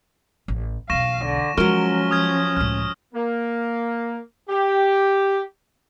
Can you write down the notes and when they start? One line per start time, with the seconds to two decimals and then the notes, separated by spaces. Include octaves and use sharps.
0.48 A1
0.90 B1 E2 F5 C#6 A#6 E7
1.25 D3
1.57 F3 F#3 G#3 C#4 A#4 C#6 F6 G7
2.11 D#6 F6 G#6
2.57 C#2 A2 F6
3.14 A#3
4.48 G4